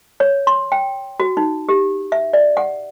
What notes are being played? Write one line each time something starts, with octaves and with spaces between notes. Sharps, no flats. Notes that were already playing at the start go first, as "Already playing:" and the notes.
C#5
C6
G5
F#4
D#4
G4
E5
D5
F#5